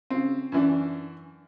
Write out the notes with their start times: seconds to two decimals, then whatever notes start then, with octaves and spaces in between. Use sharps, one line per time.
0.11 C#3 C4
0.52 F#2 E3 D4